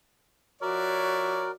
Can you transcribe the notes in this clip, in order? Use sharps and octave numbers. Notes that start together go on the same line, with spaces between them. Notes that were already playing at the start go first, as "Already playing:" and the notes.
F3 F#4 A#4 C#5 D5 E5